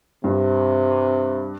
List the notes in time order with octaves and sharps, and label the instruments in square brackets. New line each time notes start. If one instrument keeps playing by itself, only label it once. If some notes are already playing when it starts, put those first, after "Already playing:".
[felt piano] G2 [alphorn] C3